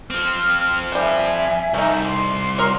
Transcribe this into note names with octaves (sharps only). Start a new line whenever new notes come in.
F3 C4 F6
G3 E5 F#5 G#5
C2 A3 D#4
C6 D6
F#3 A#4 C#5